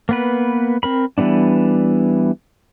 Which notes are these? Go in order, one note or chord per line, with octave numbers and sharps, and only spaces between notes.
A#3 B3 B4
C4 A#4 B5
E3 G3 B3 D4